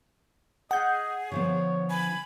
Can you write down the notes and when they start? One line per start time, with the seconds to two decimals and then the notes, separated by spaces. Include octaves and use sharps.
0.71 G#4 D#5 F#5 G6
1.32 D3 F3 B3 C#5
1.90 G#5 B5